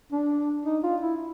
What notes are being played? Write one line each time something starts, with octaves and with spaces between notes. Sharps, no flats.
D4
D#4
F4
E4